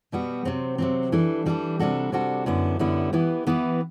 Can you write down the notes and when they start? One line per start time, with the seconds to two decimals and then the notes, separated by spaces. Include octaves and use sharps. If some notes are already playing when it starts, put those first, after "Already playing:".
0.12 B2 G3 B3 F#4
0.45 C3 F#3 C4
0.78 C3 F#3 C4
1.12 E3 G3 D4 A4
1.46 E3 G3 D4 A4
1.79 C3 G3 D4 F#4 A4
2.12 C3 G3 D4 F#4 A4
2.46 F#2 D3 G3 B3 E4
2.79 F#2 D3 G3 B3 E4
3.13 E3 B3 E4 G4
3.47 E3 B3 E4 G4